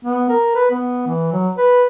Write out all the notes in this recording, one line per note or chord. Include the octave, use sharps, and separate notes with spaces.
B3
A#4
B4
B3
E3
F#3
B4